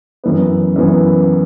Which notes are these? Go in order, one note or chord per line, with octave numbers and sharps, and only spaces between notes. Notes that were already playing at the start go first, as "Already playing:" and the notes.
F#2 E3 B3
F#2 E3 B3